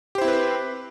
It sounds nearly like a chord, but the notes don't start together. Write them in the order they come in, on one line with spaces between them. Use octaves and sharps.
G4 C5 E4 C4 B4